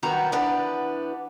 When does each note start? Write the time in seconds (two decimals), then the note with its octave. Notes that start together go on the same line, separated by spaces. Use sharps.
0.03 F#2 D#3 G3 B3 F#4 A#5
0.32 E2 B3 D4 G4 D5